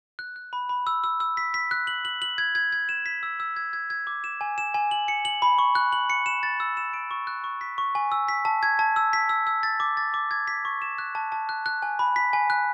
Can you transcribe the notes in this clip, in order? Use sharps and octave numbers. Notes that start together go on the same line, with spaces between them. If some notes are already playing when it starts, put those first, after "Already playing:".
F#6
F#6
B5
B5
E6
E6
E6
B6
B6
F#6
F#7
F#7
F#7
G#6
G#6
G#6
E7
B6
E6
E6
G#6
G#6
G#6
D6
E7
G#5
E7
G#5
F#7
C#7
F#7
B5
C#6
F#6
F#7
C#7
E7
A6
E6
E7
D7
C#6
F#6
C#6
B6
C#6
G#5
E6
B6
A5
G#6
A5
E6
B6
E6
E6
A6
D6
A6
D6
G#6
B6
C#6
E7
F#6
A5
A5
F#6
F#6
G#5
B5
B6
G#5
F#6